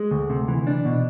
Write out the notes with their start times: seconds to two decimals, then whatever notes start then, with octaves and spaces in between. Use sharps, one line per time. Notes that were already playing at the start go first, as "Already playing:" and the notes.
Already playing: G#3
0.11 D2
0.30 C3
0.48 E3
0.67 D4
0.85 B2